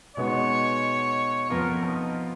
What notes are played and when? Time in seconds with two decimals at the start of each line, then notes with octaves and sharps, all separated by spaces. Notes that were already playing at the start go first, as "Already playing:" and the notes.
0.16 B2 G#3 B3 D#4 F#4 C#5
1.50 F2 F3 B3 F4 A#4
1.84 D#4